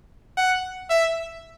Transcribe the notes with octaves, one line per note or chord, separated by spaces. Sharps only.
F#5
E5